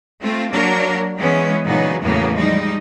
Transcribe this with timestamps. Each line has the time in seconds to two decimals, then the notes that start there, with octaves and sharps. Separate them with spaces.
0.22 A3 C4 F4
0.51 F#3 A#3 D4 A#4
1.16 E3 G#3 B3 C#4
1.66 A#2 C#3 E3 F#3 B3 D#4
2.02 E2 A2 C#3 F#3 A#3 B3
2.35 F3 G3 G#3 D#4